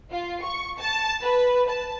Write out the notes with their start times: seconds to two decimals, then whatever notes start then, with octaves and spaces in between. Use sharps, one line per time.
0.10 F4
0.42 C#6
0.78 A5
1.21 B4
1.68 A5